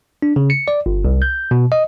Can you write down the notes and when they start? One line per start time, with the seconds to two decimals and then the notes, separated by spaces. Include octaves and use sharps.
0.22 D4
0.36 C#3
0.50 C#7
0.68 D5
0.86 G1
1.05 C2
1.22 G6
1.51 B2
1.72 D#5